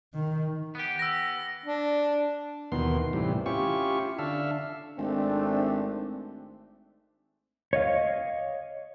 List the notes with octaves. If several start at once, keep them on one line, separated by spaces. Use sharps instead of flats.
D#3
B3 G4
E6 A#6
D4
D#2 B2 D#3 E3 B3 C6
A2 C3 E3 G3
C#4 E4 F4 G4 C#6
D3 D4 A4 E5 F5
G#1 A3 C4 D4
C#5 D#5 F5